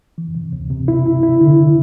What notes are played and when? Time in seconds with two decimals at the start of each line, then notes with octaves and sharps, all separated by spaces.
0.18 E3
0.35 C3
0.53 D2
0.70 C3
0.88 E4
1.06 E4
1.23 E4
1.41 D3